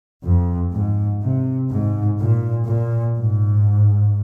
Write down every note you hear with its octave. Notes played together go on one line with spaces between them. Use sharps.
F2
G#2
C3
G#2
A#2
A#2
G#2